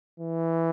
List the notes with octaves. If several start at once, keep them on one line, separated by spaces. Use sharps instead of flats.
E3